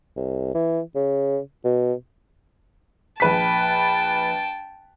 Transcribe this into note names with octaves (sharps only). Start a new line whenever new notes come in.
C2
E3
C#3
B2
A#1 B4 G5 A5 B6